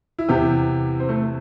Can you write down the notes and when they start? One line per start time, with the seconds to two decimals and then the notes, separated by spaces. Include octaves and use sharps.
0.19 E4
0.29 E2 C3 E3 G4
1.00 C4
1.09 A3